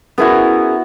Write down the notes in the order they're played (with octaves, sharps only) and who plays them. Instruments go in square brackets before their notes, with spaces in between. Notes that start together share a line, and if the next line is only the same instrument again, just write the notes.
[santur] B3 E4 F#4 [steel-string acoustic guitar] C#4 G#4 A#4